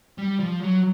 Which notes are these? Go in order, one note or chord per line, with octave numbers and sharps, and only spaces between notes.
G3
F3
F#3